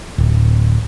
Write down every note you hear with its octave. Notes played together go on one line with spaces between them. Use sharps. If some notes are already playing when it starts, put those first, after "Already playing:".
D1